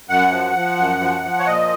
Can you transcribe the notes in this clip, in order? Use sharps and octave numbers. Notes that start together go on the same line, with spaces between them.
F#2 F#5
F3
F3
F#2
F3
F3
C#5
A#2 D#5